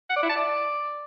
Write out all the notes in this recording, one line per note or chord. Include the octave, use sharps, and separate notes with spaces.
F#5
D5
E4
A5
D5